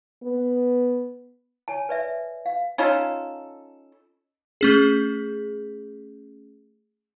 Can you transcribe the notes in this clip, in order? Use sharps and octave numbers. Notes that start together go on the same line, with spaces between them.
B3
C#5 G#5 A5
B4 D5 E5
F5
C#4 D#4 F4 A4
A3 C#4 G#4